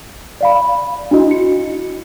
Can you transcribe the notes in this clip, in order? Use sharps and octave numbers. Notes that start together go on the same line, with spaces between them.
D5 F5 B5
D4 E4 F#4 D#5
C#7